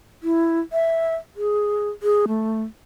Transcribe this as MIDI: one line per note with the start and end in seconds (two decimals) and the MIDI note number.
0.23 0.60 64
0.73 1.15 76
1.36 1.89 68
2.03 2.26 68
2.28 2.62 57